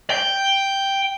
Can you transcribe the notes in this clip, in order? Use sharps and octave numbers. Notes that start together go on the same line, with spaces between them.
G5